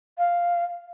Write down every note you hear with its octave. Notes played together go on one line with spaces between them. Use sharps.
F5